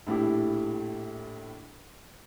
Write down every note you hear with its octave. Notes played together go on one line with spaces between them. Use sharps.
A#1 A2 E4 G4